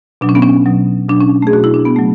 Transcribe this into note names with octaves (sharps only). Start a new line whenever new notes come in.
B2 F#3 D4
C#4
B3
C#4
B2 F#3
B2 F#3 D4
C#4
A3
G#4
B2 F#3 F#4
E4
D4
B3
C#3 F#3 A3